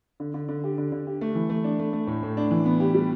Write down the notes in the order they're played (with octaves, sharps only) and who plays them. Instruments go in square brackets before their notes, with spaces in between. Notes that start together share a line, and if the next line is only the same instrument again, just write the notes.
[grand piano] D3
D3
D3
G4
D3
D3
G4
A3
E3
A3
D4
A3
A3
A2
A2
D4
E3
B3
G4
G3